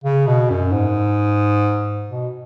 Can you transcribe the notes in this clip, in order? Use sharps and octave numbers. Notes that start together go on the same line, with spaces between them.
C#3
B2
F#2
G#2
B2